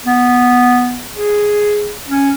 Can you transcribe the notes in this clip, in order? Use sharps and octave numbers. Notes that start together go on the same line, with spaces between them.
B3
G#4
C#4